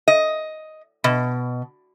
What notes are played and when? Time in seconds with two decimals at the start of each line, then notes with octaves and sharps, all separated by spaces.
0.08 D#5
1.04 B2